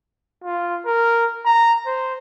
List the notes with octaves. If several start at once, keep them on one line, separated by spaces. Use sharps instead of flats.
F4
A#4
A#5
C5